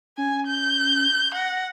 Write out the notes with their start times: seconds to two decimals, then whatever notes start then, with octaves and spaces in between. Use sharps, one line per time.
0.18 C#4 G#5
0.47 G6
1.35 F#5 A#6